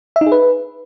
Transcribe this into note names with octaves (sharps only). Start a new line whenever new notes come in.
E5
D#4
G#4
B4